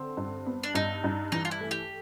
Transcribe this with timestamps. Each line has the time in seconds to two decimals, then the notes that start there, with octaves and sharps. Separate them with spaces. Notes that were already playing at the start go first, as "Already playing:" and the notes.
Already playing: D3 C4
0.17 G2
0.46 B3
0.63 D4
0.75 G2 D#4
1.04 G2
1.32 E3 D#4
1.45 F4
1.51 E4
1.60 A3
1.71 G4